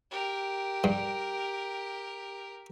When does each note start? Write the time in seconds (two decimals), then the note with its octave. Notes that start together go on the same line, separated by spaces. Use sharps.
0.11 G4 A#4
0.84 G2